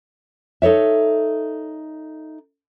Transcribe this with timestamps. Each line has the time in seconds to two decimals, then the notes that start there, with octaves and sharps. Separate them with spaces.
0.62 D#4 A4 C#5 E5